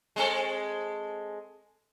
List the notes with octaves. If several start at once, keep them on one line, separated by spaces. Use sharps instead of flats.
G#3 C4 A4